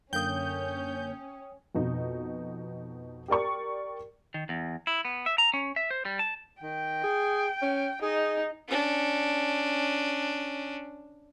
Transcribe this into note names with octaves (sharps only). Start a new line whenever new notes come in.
F#2 D3 A#3 C#4 G5 D#6 G6
F2 B2 D#4
G4 A#4 D5 C#6
D#3
E2
E4
B3
E5
A#5
C#4
E5
C5
G3
A5
D#3 G5
G#4
C#4
D#4 G#4
C#4 D4